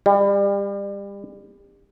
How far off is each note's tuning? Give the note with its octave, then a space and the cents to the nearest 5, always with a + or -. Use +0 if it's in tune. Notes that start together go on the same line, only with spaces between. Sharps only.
G3 +30